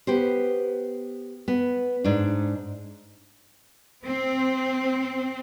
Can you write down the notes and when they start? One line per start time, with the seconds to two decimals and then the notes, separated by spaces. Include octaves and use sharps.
0.07 B3 G4 C5
1.48 B3
2.04 G#2 D4
4.05 C4